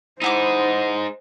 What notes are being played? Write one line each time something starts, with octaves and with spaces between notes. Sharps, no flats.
G#3 D#4 E4 C5 F#5 D6